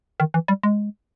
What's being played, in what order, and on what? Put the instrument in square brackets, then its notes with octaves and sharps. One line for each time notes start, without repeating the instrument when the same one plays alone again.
[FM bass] D#3
E3
G3
G#3